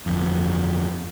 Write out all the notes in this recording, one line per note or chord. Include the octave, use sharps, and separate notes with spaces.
G1 F2